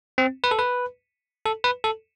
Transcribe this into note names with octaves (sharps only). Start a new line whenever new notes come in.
C4
B4
A4
B4
A4
B4
A4